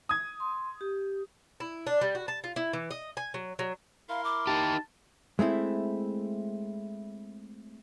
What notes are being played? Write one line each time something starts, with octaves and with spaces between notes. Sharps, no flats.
D#6 G#6
C6
G4
E4
D4
G3
F#4
A5
F4
E4
E3
D#5
G#5
F#3
F#3
E4 A#4 F5 C6
D6
D#4 G4 A5
G#3 A3 C4 E4